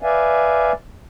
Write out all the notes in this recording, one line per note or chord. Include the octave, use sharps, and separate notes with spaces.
B4 D5 E5 F5 G#5